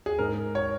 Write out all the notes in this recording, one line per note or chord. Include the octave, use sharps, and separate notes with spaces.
G#4
G#2 A#4
C#5